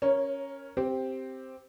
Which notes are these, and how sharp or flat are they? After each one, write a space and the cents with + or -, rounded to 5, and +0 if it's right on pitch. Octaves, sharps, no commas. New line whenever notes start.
C#4 +0 A#4 +0 C#5 -30
C4 +0 G4 +0